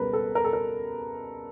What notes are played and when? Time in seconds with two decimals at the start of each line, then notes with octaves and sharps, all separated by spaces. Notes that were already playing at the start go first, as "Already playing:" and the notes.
Already playing: C#2 B2 G3 A#4 B4
0.13 A4
0.35 A#4
0.44 A4
0.53 A#4